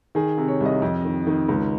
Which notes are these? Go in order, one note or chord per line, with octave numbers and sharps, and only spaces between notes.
D#3 G#4
C3
C#5
C2
D#5
F2
D#3
D#3
C#2